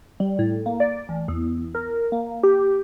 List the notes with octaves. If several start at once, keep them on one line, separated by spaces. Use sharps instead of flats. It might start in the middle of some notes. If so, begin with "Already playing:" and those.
G3
A2
A#3
D5
A1
E2
A#4
A#3
G4